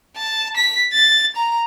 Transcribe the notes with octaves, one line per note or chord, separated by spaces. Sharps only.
A5
B6
A6
A#5